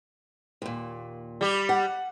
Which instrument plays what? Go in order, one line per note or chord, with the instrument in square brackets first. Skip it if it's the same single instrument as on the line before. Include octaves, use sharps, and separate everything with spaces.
[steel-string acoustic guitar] D#2 A#2
[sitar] G3 G4
[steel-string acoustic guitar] F#5